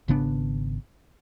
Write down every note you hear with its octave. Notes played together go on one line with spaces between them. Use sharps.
G#1 C#3 B3 D4